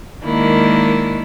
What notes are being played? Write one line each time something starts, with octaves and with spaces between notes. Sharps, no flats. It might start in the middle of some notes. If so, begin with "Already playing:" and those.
D#3 G#3 A#3 D4 E4